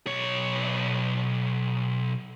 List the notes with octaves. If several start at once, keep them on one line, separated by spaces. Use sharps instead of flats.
B1 C#5